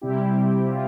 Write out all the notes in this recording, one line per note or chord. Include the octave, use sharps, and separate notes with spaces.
C3 G3 C4 E4 G4
F4